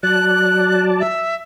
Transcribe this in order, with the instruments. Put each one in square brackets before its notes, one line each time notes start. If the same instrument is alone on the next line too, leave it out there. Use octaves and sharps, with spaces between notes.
[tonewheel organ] F#3 D5 A5 [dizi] F#6
[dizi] E5